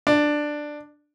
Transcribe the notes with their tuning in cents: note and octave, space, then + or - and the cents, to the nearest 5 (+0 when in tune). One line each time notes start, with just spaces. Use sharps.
D4 +10